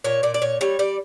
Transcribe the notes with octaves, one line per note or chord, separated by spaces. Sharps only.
A#2 C#5
A#2 D5
D5
A#2 C#5
G3 C#5
G3 D5